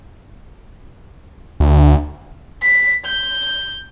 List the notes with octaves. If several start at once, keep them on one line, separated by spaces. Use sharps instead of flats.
D2
B6
G6